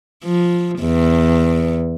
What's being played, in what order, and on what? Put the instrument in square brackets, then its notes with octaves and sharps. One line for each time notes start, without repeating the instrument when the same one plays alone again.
[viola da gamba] F3
E2